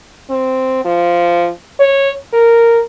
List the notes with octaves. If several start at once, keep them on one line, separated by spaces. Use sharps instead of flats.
C4
F3
C#5
A#4